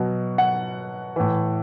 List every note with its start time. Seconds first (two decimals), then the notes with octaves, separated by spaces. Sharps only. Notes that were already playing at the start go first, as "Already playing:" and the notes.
Already playing: B2 F#3
0.38 F#5
1.16 A2 E3